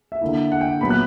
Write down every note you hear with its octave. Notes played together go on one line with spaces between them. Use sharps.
E5
D3 A#3 E4
F#5
G5
A#2 F#3 B3 B5
F#6